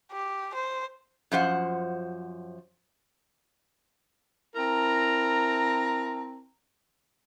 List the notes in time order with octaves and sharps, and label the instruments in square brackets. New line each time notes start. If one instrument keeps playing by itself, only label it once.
[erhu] G4
C5
[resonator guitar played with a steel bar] F#2 F3 C5 F#5
[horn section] C4 E4 A#4 A5 A#5